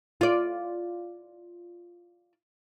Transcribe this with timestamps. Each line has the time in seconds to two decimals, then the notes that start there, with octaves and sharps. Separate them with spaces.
0.21 F4 D5